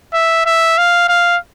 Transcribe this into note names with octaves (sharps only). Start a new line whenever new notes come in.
E5
E5
F5
F5